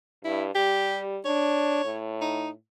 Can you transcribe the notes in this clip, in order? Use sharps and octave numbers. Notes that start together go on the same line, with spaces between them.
G2 E4
G3 G4
D4 C#5
A2
D#4